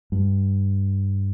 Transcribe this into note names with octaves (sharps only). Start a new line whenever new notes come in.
G2